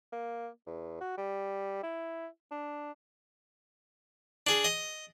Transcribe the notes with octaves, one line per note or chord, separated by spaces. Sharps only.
A#3
E2
F#4
G3
E4
D4
D4 G#4
D#5